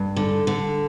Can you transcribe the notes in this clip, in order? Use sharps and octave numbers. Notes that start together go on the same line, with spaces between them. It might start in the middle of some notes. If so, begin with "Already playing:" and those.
Already playing: G2
D3
D3